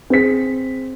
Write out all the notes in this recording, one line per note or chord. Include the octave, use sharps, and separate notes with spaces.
C4 G#4 B6